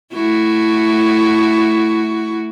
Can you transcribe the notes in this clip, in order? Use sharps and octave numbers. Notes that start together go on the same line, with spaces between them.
A3 E4 F#4